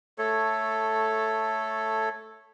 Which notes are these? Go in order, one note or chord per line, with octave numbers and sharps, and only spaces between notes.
A3 A4 C#5